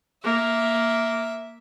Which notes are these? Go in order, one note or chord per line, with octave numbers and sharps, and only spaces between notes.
A#3 E5